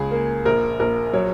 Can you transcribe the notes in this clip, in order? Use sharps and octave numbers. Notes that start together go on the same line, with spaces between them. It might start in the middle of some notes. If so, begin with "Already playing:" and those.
Already playing: C#2 G#4
A#3
A#1 A#4
A#1 A#4
F#3 C#5